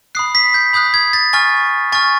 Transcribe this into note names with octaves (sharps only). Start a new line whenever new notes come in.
B5 D#6 F#6 C7
B6
G6
B5 D#6 F#6 G6
G#6
A6
G#5 C#6 F6 A6
G#5 C#6 F6 A6